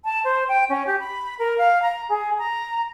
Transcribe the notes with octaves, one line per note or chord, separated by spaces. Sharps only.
A5
C5
G5
C#4
G4
B5
A#4
F5
A#5
G#4
A#5